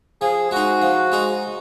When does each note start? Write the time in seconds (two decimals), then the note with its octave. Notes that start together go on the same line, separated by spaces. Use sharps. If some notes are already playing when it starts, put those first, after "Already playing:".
0.21 F3 G#4
0.51 G#3 D#4 F#4
0.82 F3
1.12 G#3 D#4